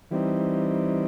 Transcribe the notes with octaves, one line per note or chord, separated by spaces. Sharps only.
E3 G3 C4 D#4